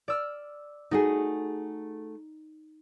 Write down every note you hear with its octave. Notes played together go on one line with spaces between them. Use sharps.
D5 E6 F6
A3 D#4 F#4 G#4